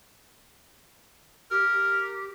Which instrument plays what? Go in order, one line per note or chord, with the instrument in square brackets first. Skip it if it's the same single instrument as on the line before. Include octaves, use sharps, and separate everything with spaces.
[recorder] G4 [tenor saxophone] A#4